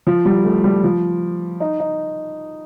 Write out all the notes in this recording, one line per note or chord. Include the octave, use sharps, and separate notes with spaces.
F3
G3
A3
G3
F3
D#4
D#4